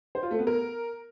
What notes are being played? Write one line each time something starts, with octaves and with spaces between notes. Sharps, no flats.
C5
F4
A3
B3
A#4